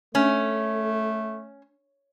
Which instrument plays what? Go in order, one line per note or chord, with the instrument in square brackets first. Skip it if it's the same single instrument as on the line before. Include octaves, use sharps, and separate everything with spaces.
[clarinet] A3 [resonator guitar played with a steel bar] C#4 [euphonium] A4